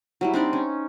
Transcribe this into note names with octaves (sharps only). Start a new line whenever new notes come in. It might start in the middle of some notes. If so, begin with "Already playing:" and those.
F#3 G3 E4
C4 D4 D#4 D5
C#4